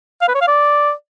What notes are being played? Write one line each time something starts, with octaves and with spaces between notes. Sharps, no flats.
F5
B4
C#5
F5
D5